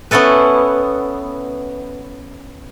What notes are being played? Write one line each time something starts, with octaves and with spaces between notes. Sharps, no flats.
B3 C#4 E4 A4 B4